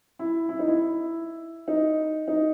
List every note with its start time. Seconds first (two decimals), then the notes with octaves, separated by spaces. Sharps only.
0.19 E4
0.49 E4
0.59 D#4
0.68 E4
1.68 D#4
2.28 D#4